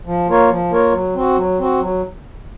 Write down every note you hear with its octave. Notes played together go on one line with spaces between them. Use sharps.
F3
A#3 F4 A#4 C#5
F3
A#3 F4 A#4 C#5
F#3
C4 F#4
F#3
C4 F#4
F#3